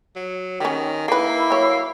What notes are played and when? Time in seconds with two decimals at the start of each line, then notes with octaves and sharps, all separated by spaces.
0.16 F#3
0.60 D#3 C#4 G4
1.08 A#3 D#4 E4 B4
1.50 F#3 C#5